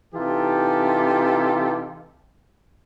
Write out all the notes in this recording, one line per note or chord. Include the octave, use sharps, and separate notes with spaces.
C3 E3 D#4 F4 G4 A4